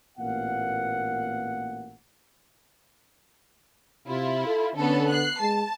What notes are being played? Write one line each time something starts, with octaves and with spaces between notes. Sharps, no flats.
A1 A#2 A#3 B3 F5 F#5
C3 E4 F4
A4
D3 B3 C#4 A4
F#6 C7
G#3 A5